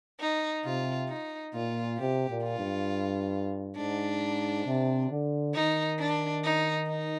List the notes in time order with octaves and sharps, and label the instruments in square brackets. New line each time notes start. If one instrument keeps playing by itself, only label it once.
[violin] D#4
[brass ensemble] C3 [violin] F4
[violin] D#4
[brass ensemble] A#2 [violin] F4
[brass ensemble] C3 [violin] G4
[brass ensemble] A#2
[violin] F4
[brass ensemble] G2
[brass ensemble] G#2 [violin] D4
[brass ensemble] C3
D3
[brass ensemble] D#3 [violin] D#4
[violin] D4
D#4
D#4